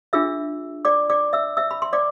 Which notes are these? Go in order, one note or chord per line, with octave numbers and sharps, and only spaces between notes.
D4 F4 G#4 E5 E6
D5 D6
D5 D6
E5 E6
E5 E6
B5
C6
D5 D6